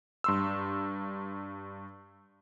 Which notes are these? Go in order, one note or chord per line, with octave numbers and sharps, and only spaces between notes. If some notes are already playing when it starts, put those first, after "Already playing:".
G2 C6 E6